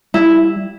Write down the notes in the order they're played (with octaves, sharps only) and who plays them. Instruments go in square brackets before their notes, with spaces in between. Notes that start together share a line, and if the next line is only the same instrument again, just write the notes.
[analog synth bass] G3 [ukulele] E4